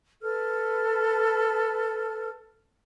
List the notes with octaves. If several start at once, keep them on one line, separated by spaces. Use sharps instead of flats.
A4 B4 F6